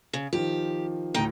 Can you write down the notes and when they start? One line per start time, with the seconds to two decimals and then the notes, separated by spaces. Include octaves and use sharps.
0.13 C#3
0.33 D#3 F3 G4
1.14 D2 A2 D#4 G5